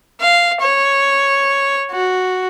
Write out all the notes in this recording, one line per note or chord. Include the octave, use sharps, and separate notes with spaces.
F5
C#5
F#4